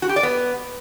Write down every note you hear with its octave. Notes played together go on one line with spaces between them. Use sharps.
F#4
G4
D5
B3